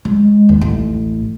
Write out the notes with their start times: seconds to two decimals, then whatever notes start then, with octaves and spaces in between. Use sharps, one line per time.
0.05 G#3
0.49 D#2
0.61 A1